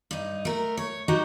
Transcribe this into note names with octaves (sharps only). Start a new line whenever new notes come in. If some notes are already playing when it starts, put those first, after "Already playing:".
G2 D#4
A3 A#4
C#5
F#3 D#4 F#4 G4 F#5